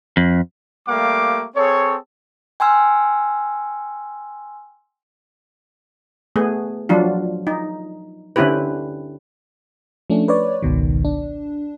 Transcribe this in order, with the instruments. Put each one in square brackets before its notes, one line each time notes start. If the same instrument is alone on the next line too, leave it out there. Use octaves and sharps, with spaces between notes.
[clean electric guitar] F2
[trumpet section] G3 A3 A#3 G4 F5 D6
C4 G#4 A4 C#5
[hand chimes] G5 G#5 C6 E6 F6
[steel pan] A3 B3 G#4
F3 F#3 D4 F4
D#4
D3 C4 C#4 E4 G4 B4
[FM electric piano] F3 A3 C#4 D4
B4 C#5 D5
G#1 C#2 B2 D#3
D4